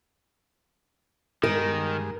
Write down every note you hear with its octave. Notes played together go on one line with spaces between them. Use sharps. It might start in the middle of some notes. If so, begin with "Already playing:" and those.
G2 D#3 G#3 A#4